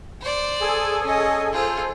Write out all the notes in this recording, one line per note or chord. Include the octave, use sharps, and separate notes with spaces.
C5 D5
G#4 A4 G#5
C#4 D#5
F4 G#4 A4 C5